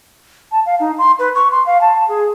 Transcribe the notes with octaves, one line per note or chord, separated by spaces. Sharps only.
A5
F5
D#4
C6
B4
C#6
C6
F5
A5
G#4